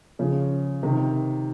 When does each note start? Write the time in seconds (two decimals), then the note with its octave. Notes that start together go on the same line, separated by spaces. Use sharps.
0.19 C#3 F3
0.83 C3 D#3